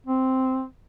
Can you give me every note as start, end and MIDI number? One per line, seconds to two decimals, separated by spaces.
0.07 0.64 60